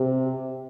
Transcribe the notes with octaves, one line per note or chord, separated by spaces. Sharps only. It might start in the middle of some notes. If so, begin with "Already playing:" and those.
Already playing: C3